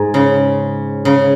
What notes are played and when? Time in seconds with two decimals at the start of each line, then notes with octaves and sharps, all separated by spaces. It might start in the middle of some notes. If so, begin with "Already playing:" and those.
Already playing: G#2
0.14 C#3
1.05 C#3